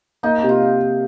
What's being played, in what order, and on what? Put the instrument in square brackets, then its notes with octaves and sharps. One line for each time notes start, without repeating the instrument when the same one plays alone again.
[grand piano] A#3 [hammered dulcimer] D#4
[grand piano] C3
[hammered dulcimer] F4